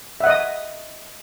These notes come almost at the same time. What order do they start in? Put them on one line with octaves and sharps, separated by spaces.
E5 F#5 D#5 D#6